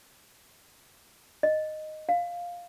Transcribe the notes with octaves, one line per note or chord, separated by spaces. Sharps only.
D#5
F5